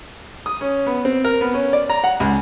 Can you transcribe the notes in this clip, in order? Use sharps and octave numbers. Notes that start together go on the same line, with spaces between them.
D#6
C#4
B3
C4
A#4
B3
C#4
D5
A#5
F#5
C#2